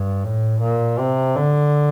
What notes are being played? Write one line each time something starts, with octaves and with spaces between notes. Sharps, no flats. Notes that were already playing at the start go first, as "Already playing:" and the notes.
Already playing: G2
A2
A#2
C3
D3